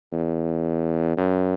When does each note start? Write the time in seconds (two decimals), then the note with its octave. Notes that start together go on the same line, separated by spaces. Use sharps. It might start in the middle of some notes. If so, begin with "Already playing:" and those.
0.12 E2
1.17 F#2